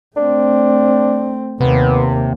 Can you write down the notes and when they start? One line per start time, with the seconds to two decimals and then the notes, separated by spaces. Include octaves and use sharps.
0.16 A3 C4 D4
1.60 D#2 C3 A#3 B3